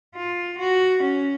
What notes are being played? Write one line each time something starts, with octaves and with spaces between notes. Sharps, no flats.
F4
F#4
C#4